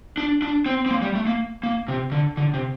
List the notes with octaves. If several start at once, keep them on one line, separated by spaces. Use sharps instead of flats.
D4
D4
C4
C4
A#3
G3
A3
A#3
A#3
C3
D3
D3
C3